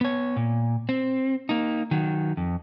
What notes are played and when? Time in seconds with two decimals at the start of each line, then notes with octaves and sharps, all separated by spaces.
0.01 B3 C#5
0.37 A#2
0.89 C4
1.49 A#3 D#4
1.91 D#3 F#3
2.37 F2